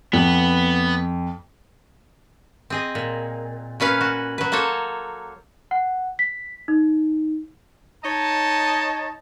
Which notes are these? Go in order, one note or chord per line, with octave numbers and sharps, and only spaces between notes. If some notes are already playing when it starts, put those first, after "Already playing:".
F2 B3
C4 G#4 D#5
A#2
A#2 C#4 B4 F5
F#4
F#3 B4
A#3 A4 C5 C#5
F#5
B6
D#4
D#4 C#5 D#5 A5